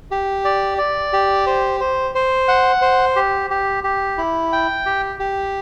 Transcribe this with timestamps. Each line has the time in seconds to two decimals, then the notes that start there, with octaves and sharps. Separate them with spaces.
0.11 G4
0.45 D5
0.78 D5
1.13 G4
1.47 C5
1.80 C5
2.15 C5
2.48 F#5
2.82 C5
3.16 G4
3.50 G4
3.84 G4
4.18 E4
4.52 G5
4.86 G4
5.19 G4